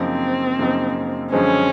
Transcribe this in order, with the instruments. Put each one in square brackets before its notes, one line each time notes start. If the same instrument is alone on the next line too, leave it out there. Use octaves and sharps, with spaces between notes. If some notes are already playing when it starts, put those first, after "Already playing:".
Already playing: [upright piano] F#2 C#3 F3 A#3 D#4 [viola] C4
[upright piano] F#2 C#3 F3 A#3 D#4
[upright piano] F#2 D3 F3 G#3 C4 [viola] C#4